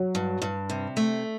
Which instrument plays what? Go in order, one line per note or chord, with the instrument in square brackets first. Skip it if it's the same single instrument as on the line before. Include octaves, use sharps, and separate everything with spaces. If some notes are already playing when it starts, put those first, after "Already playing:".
Already playing: [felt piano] F#3
[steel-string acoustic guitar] G2
G2
C3
A3